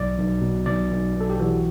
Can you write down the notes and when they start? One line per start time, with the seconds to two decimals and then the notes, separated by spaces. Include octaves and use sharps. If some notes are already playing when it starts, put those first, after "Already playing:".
Already playing: B1 D5
0.18 B1
0.41 B2
0.66 B1 D5
0.90 B1
1.15 B1
1.21 A4
1.30 G4
1.39 E3 F#4